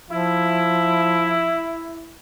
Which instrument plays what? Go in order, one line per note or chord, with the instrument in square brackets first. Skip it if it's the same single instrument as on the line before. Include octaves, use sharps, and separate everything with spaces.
[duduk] F3 [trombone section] E4